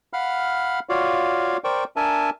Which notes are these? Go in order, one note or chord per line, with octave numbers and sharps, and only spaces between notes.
F5 F#5 B5 F6
F4 F#4 C#5 D5 F5
A#4 C5 D5 G5 C#6
D4 A#4 E5 G#5 A5